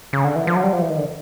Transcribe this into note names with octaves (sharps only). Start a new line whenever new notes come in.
C#3
D3
E3
F3
F#3
G3
F3
E3
D#3
D3